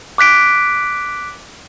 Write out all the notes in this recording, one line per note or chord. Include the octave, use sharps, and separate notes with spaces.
D6 F#6 B6 D7